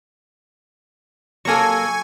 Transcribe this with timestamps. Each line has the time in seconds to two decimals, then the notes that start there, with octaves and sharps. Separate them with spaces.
1.45 F#3 A#3 A4 G#5 C#6